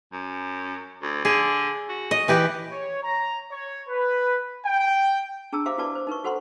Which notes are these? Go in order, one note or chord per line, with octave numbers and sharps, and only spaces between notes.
F#2
D2
D3 G#4
F#4
D#5
E3 G4 B4
C#5
A#5
C#5
B4
G5
D4 G#4 A5 A#5 E6
G4 C5 E5 F5 A#5 D6
E4 F#4 B4 D5 A5 D6
C5
D#4 A#4 B4 C#6
F#4 A4 C5 F#5 A#5 C6